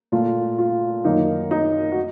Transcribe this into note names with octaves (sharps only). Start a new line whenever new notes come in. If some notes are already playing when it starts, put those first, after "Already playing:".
A#2 A3 F4
F4
F#2 D#3 A#3 D#4
D#4
F#4